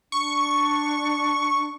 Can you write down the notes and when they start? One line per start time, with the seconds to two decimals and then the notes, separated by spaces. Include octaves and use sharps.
0.12 D4 C#6